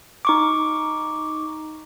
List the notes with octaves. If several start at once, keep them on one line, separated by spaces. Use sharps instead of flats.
D#4 C#6 D6